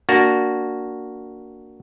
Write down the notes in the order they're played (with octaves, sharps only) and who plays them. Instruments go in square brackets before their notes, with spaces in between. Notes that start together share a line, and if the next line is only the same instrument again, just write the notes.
[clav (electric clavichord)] A#3 D4 F#4